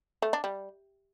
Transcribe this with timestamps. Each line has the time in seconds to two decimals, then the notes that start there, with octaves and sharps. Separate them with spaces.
0.22 A3
0.33 D4
0.44 G3